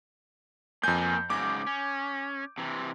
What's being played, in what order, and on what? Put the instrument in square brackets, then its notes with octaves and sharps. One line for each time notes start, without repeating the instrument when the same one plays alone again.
[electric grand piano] F2 G6 [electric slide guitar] A#3 B3 G#5
[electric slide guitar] G#2 C#3 F#3 [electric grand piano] D6
[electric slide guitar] C#4
C3 E3